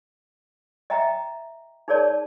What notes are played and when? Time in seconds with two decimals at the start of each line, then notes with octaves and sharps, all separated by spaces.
0.90 D#5 E5 G5 A#5
1.88 D#4 G#4 A#4 C#5 D5 A5